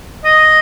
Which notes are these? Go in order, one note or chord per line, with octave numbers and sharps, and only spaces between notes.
D#5